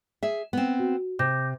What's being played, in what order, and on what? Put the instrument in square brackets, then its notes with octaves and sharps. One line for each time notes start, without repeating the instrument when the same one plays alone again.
[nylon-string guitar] G#4 E5
B3 C4
[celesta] F#4
[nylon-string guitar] C3 [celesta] D6 G6 A#6